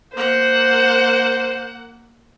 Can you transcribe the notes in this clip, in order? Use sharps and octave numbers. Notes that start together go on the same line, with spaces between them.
A#3 C5 F#5